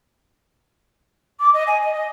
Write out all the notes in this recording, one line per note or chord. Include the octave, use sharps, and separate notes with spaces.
D6
D#5
G#5
D#5
D#5